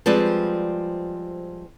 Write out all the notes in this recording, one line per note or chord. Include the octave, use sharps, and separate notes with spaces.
F3 G3 G#3 C4 B4 D5